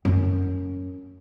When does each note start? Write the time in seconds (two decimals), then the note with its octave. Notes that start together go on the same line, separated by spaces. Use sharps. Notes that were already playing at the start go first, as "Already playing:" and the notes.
0.05 F#2 C#4